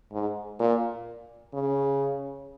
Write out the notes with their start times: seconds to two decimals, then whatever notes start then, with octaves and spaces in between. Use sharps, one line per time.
0.12 G#2
0.59 A#2
1.54 C#3